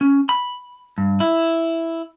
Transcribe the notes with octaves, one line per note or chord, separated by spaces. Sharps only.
C#4
B5
G2
E4